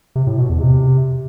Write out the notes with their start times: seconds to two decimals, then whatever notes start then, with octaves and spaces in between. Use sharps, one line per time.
0.15 C3
0.27 A2
0.38 B2
0.49 E2
0.60 C3